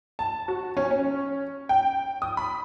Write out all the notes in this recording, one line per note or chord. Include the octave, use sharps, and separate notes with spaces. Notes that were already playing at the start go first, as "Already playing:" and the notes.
A5
F#4
C#4
C#4
G5
D#6
B5